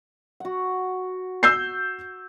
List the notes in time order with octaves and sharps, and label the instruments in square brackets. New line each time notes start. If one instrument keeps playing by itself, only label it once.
[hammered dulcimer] F#4 F#5
[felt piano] E6 G6 C7